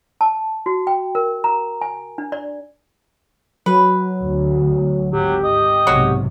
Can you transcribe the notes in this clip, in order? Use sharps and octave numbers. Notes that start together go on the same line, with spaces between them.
A5
F#4
G5
A#4
A#5
G#5
D4
D5
F#3 B4
D2
G#1 F#3 G4
D#5
B1 G#2 C3 F#3 F#4 C#5